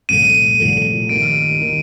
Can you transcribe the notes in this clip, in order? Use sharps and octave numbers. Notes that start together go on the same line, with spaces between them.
C2 A#2 F3 A3 D#7
C2 A#2 F3 A3
D#2 D#3 A#3 D#4 G4 D7
D#3 A#3 D#4 G4